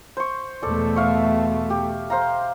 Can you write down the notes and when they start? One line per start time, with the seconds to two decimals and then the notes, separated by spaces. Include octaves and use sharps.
0.17 C5 C#6
0.62 E2 B2 A3 A4 D5
0.96 E5 F5 C#6
1.70 G4
2.10 C5 F5 A#5